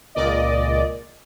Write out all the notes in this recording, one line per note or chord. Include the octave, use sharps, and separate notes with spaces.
C#2 A#2 D5 D#5